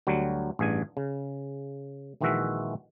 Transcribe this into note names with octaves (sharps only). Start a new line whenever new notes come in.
D2 F#3 G3
A1 G2 G#4 G#5
C#3
A#1 D#3 E3 G#3 F#4 E5